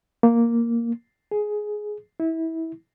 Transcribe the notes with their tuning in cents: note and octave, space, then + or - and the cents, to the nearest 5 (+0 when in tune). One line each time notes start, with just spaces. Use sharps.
A#3 +0
G#4 +10
E4 -25